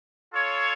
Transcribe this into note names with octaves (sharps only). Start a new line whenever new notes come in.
F4 A4 C#5